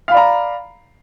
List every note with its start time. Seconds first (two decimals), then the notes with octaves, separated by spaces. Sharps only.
0.08 F5
0.11 B5
0.14 D5
0.17 A#5